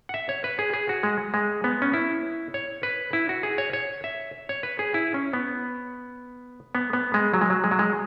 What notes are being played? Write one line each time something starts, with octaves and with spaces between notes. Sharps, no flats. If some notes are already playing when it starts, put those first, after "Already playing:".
F#5
E5
C#5
B4
G#4
G#4
F#4
G#3
G#3
B3
C#4
E4
C#5
B4
E4
F#4
G#4
C#5
C#5
E5
C#5
B4
G#4
E4
C#4
B3
B3
B3
G#3
F#3
G#3
F#3
G#3
F#3
G#3